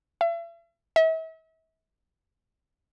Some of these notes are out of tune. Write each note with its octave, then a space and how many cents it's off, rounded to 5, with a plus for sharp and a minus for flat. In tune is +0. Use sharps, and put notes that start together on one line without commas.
E5 +40
E5 -40